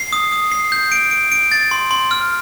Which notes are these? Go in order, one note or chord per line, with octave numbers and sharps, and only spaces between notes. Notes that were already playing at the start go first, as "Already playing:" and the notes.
Already playing: C7
D#6
D#6
C7
G6
D7
D7
D7
A6
C6
C6
F6